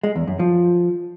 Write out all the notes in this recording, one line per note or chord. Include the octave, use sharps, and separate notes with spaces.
G#3
E2
F#2
F3